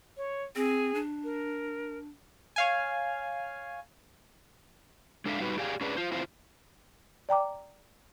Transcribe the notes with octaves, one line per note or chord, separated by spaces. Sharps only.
C#5
C4 G#4
D4
A#4
C#5 F5 G#5
G#3 D4 A4 C5 E5 F5
G3 D#4 F#4 B4
G4 G#4 D5 F5 G#5
C#4 D4 G#4 B4 D5
F4 C5
C4 E4 F4 C5 E5 F5
D5 G5 A#5 D6